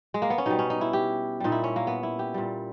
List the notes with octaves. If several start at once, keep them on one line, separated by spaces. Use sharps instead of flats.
G#3
A#3
B3
C#4
B2 G3 D#4
C#4
D#4
E4
G4
A#2 G3 D#4
E4
C#4
A#3
B3
E4
G4
A#2 G3